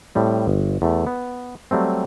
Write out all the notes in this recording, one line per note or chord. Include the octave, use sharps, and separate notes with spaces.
A2 G3 C4
G1
E2 A3
B3
F#3 G3 A3 C4